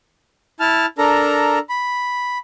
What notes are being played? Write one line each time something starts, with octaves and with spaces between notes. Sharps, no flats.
E4 A5 F6
D4 A4 A#4 A#5
B5